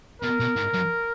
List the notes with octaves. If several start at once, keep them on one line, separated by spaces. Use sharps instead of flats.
B2 A#4
B2
G#2
F#2